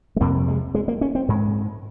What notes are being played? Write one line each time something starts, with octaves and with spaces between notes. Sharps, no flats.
G#3
F2 C3 A#3
G#3
G#3
A#3
C#4
C4
G#2 G#3